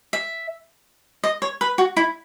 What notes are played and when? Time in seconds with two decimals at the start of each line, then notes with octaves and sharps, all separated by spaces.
0.13 E5
1.24 D#5
1.42 C#5
1.61 B4
1.78 F#4
1.97 E4